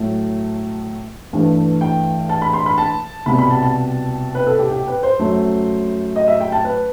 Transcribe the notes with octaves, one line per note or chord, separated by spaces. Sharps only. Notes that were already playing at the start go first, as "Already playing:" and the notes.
Already playing: A2 F#3 A3
G2 E3 A3
G5
A5
B5
C6
B5
A5
C2 B2 G3 B5
B5
A5
A5
B4
A4
G4
G4
B4
C5
F#2 F#3 A3
D#5
E5
G5
A5
B4